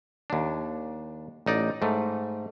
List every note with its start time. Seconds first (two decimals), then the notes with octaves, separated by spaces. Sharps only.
0.30 D#2 D4
1.46 A1 D#4 D5
1.82 G#2 A3